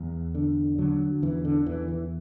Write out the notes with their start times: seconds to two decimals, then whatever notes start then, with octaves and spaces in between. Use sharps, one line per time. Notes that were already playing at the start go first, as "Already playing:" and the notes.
Already playing: E2
0.35 D3
0.78 D3 F#3
1.22 E2 E3
1.45 D3
1.66 E2 E3
1.88 E3